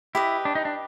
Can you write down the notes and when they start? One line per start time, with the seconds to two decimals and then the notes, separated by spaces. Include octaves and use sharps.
0.15 E4 G4 B4 D#5
0.45 D4
0.55 D#4
0.65 D4